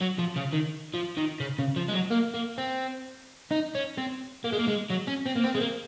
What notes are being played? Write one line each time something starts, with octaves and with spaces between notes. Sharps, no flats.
F#3
F3
C#3
D#3
F3
D#3
C#3
C#3
F3
G#3
F#3
A#3
A#3
C4
D#4
C#4
C4
A#3
G#3
A#3
G#3
F#3
C#4
C4
A#3
C4
G#3
A#3